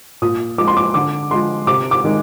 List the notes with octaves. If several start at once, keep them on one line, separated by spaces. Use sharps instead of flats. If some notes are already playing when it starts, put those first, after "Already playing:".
A#2 D#6
F3 G#3 D6
C6
D6
D3 D6
F3 G#3 C6
C3 D6
D6
D#3 G#3